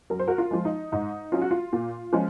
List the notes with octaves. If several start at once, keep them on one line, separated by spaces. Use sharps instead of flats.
F#2 A#4
C5
F#4 A#4
F4
F3 G#3
D#4
G#2 D#4
F#3 C#4 F4
F#4
F4
A#2
F3 G#3 C#4